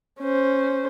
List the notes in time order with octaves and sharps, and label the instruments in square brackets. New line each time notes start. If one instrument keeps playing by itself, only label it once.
[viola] C#4 C5